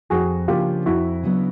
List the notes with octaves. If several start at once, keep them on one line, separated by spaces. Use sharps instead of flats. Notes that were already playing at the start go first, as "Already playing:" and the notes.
F2 F#4 G#4
C#3 F3 A#3 D4 F4 G4
F2 E4 F#4
C#3 F#3 B3 D4